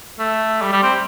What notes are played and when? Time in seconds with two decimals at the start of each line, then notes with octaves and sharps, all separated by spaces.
0.19 A3
0.62 G3
0.72 G3
0.83 C4